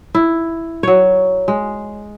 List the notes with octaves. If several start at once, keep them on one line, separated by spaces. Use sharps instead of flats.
E4
F#3 C#5
G#3